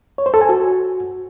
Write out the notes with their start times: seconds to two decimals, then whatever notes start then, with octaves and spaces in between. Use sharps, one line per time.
0.18 C#5
0.26 C5
0.34 A4
0.41 G#5
0.49 F#4